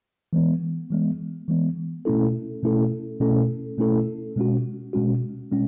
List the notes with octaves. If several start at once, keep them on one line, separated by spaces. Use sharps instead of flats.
E3 G#3 B3
E3 G#3 B3
E3 G#3 B3
B2 A3 C#4 E4 A4
B2 A3 C#4 E4 A4
B2 A3 C#4 E4 A4
B2 A3 C#4 E4 A4
B2 G#3 C#4 F#4
B2 G#3 C#4 F#4
B2 G#3 C#4